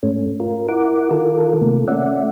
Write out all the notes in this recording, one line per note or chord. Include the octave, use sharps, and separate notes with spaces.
G#2 A3 C#4
F4 A#4
E4 A#4 F#5 D6
D#3 F4 A4 A#4
C3 A3 A#3
A3 C#4 D5 E5 F#5